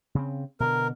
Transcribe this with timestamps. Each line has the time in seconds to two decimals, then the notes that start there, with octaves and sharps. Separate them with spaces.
0.15 C#3 C4
0.60 B2 D3 A#4